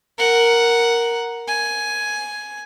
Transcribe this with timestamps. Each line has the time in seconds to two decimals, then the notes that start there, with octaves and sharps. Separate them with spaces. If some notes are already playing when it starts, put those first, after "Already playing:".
0.18 A#4 F#5
1.48 G#5